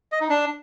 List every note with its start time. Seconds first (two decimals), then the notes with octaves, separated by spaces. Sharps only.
0.12 D#5
0.21 D#4
0.29 D4